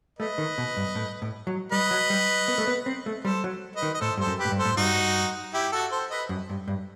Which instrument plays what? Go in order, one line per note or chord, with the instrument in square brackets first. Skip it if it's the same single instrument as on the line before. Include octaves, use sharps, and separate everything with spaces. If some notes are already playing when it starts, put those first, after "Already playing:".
[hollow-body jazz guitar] A3 [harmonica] B4 D#5
[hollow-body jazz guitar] D#3
B2
G2
A2
A2
F#3
[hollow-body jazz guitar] G3 [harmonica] B4 D#5
[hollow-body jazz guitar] F#3
G3
B3
A3
B3
C4
A3
[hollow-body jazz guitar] G3 [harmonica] A4 C5
[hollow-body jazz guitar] F#3
[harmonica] B4 D#5
[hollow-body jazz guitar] D#3
[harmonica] D#5
[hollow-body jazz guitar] A2 [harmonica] A4 C5
[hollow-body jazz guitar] G2 [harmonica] A4 C5
[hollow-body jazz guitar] F#2
[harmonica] G4 B4
[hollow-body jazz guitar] A2
G2
[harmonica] A4 C5
[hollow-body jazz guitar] A2
[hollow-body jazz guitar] G2 [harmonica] D#4 F#4
[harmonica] E4 G4
F#4 A4
A4 C5
B4 D#5
[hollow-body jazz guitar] F#2
G2
G2